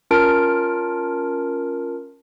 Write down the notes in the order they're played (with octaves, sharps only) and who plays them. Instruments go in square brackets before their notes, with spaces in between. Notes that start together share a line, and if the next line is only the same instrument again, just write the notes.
[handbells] C#4 F4 A#4 A5 F6 D7